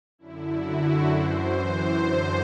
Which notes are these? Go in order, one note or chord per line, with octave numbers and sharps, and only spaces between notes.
F#2 D3 E4
F#4
F#2 E3 C5
C5
F#2 D3